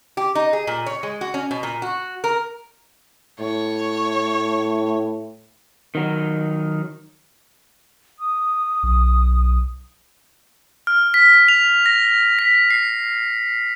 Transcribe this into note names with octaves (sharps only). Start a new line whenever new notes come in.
G4
D#4
G#4
A#2
C#5
G#3
F#4
C#4
B2
A#2
F#4
A#4
A2 C#5
D#3 F#3 D#4
D#6
B1
F6
B6
F7
A#6
B6
C7